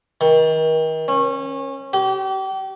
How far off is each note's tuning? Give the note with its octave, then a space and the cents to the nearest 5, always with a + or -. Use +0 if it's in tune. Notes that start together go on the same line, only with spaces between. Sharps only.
D#3 +35
C#4 -25
G4 -35